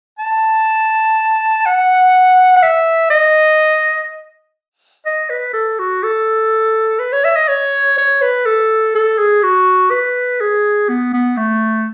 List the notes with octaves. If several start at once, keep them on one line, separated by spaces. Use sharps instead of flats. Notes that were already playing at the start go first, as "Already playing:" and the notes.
A5
F#5
F#5
E5
D#5
D#5
B4
A4
F#4
A4
B4
C#5
E5
D#5
C#5
C#5
B4
A4
A4
G#4
F#4
B4
G#4
B3
B3
A3